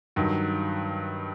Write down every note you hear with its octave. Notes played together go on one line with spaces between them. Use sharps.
G2 D#3 F#3